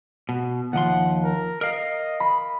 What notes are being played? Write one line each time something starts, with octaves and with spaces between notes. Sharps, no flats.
B2
D#2 F3 F#5 C6
A#4
A#4 D#5 F5
B5